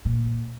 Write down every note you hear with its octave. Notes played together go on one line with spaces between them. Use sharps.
A#2